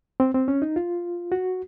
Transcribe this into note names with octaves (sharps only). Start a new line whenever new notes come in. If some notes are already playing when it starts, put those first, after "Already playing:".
C4
C4
C#4
D#4
F4
F#4